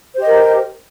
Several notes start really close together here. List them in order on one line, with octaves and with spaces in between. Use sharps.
C5 G4 D#5 A#4